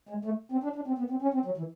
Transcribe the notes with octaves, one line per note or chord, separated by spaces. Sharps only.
G#3
A3
C4
D4
D4
C4
B3
C4
C#4
C4
F#3
E3